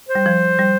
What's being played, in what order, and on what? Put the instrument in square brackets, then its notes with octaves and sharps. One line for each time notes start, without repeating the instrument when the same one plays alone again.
[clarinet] C5
[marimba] G3
F3
G3